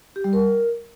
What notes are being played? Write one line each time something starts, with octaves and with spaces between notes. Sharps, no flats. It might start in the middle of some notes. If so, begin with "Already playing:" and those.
G4
G3
A#4